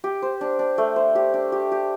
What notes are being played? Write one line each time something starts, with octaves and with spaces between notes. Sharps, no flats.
G4
C5
D4
D4
A3
C5
G4
D4
G4
G4